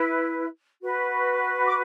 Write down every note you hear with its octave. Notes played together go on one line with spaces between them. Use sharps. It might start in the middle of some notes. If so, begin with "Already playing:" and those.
Already playing: E4 B4
F#4 B4
D6